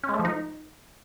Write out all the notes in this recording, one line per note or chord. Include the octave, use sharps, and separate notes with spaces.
C#4
G#3
A3
F3
D#4